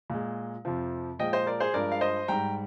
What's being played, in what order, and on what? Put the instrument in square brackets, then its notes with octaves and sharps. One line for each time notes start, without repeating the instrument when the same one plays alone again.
[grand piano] A#2 G#3
F2 C3 F3
A#2 F3 G#3 D#5 G5
C5 D#5
A#4 D5
G#4 C5
G2 F3 G#3 A#4 D5
F5
C5 D#5
G#2 G3 G5 A#5